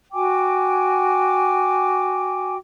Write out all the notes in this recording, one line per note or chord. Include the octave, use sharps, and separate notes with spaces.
F#4 G5 G#5 D6